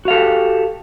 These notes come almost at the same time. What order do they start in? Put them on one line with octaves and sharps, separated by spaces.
F#4 F5 A4 G4